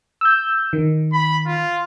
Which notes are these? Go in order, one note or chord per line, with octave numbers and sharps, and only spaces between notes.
E6 G6
D#3
B5
F4